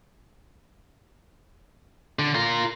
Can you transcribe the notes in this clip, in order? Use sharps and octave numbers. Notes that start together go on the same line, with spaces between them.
D3
F4 A#4